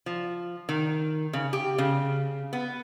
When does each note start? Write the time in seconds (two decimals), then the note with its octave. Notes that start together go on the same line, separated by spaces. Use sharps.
0.06 F3
0.69 D#3
1.33 C#3
1.53 G4
1.78 C#3
2.53 B3